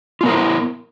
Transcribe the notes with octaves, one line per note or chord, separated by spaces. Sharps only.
B3 E4 F4 A#4 C5